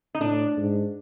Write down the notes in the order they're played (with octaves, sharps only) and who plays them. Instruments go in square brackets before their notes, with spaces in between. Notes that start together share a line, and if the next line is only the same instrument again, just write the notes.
[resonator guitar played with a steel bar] D#4
[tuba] A2 [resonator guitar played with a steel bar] D4
[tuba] G#2